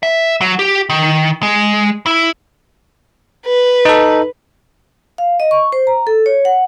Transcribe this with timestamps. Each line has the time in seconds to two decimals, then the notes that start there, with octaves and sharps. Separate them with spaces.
0.03 E5
0.41 F#3
0.59 G4
0.90 D#3
1.43 G#3
2.06 E4
3.46 B4
3.85 D#4 A4
5.18 F5
5.40 D#5
5.51 C#6
5.72 C5
5.87 A#5
6.07 A4
6.26 C#5
6.45 F#5